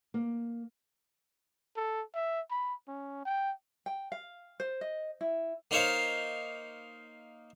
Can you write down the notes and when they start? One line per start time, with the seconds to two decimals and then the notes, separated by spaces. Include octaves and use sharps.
0.14 A#3
1.76 A4
2.14 E5
2.50 B5
2.87 C#4
3.25 G5
3.86 G5
4.12 F5
4.60 C5
4.81 D#5
5.21 E4
5.71 A#3 D#4 C5 C#5 F5